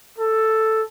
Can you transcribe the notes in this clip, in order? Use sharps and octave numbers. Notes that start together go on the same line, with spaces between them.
A4